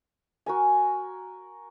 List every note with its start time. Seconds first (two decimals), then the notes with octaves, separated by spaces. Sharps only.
0.46 F#4 A#4 G#5